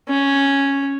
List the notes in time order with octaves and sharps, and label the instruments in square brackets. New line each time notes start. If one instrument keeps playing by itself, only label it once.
[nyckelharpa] C#4